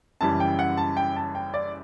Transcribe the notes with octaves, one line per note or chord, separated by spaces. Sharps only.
F#1 F#2 E3 G3 A5
G5
F#5
A5
G5
A5
G5
D5